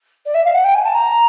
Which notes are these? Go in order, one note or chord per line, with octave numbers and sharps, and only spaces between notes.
D5
E5
F5
F#5
G5
G#5
A5
A#5